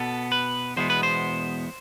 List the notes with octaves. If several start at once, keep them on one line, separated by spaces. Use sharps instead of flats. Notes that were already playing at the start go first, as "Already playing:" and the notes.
Already playing: B2 B3 A4
B4
E2 B2 G#3 B3 C5
B4
C5